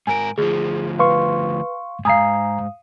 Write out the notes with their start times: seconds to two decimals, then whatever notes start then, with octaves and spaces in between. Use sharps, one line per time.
0.07 G#2 A#4 G#5 D7
0.38 D2 F3 G#4
0.99 B4 F5 C6 C#6
2.05 G#2 F5 G#5 A#5 D#6 C7